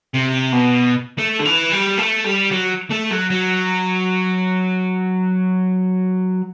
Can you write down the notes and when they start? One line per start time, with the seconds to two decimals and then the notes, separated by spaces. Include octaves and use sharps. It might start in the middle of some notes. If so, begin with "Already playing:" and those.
0.14 C3
0.52 B2
1.18 A3
1.40 D3
1.46 E3
1.72 G3
1.98 A3
2.24 G3
2.52 F#3
2.91 A3
3.11 F#3
3.30 F#3